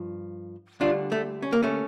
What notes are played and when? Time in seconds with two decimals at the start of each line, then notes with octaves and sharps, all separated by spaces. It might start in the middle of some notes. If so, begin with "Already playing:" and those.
Already playing: G2 F3
0.80 D2 D3 G3 D4 F4
1.12 A3
1.42 C#4
1.53 A#3
1.63 A3 C#4